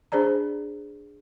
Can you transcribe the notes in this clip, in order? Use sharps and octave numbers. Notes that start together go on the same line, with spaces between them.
D4 G#4 C5 D5 A#5